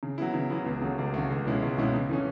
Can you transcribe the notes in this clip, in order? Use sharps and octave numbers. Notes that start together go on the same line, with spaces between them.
C#3
F#3 B3 E4
C#3
F#3 B3 E4
C#2
C#3 F#3 A3
C#2
C#3 F#3 A3
C#2
B2 G#3 C#4 E4
C#2
B2 G#3 C#4 E4
C#3
E3 A3 C#4